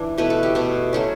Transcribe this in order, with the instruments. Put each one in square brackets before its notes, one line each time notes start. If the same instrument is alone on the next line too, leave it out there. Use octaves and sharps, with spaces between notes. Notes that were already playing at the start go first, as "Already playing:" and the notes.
Already playing: [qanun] E3 D4
B2 A3 E4 B4
A4
G4
B2 A3 E4
F#3 A3 C#4